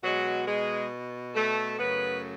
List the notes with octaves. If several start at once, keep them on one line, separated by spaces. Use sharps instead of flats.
B2 F#3 G#3 F#4
G#3 G#4
A3 A4
F#2 C#3 F#3 A3 B3 B4